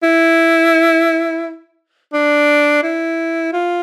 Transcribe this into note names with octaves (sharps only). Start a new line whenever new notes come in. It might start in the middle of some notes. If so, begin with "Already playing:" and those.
E4
D4
E4
F4